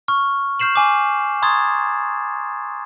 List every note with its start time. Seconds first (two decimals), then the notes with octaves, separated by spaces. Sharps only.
0.08 C#6 F6
0.60 C#6 F6 G6 C7 E7 F#7
0.74 G#5 D6 E7
1.42 A#5 C6 C#6 D#6 G#6 A6